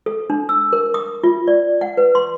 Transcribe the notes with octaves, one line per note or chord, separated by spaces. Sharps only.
A4
D4
E6
A#4
D#6
F4
D5
F#5
B4
C6